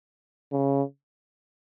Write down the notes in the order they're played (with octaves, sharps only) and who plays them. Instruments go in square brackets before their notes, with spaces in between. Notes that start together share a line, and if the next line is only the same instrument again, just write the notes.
[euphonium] C#3